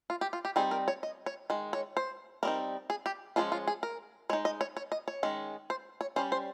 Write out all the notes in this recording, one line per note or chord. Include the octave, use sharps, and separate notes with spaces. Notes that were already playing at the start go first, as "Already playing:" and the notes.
F4
G4
F4
G4
G3 C4 D#4 G#4
A#4
C#5
D#5
C#5
D#3 G#3
C#5
C5
G3 C4 D#4 A#4
G#4
G4
F3 G#3 C#4 F4
F4
G#4
A#4
G#3 D#4 C#5
D#5
C#5
C#5
D#5
C#5
D#3 G#3 C#4
C5
C#5
G3 C#4 C5
C5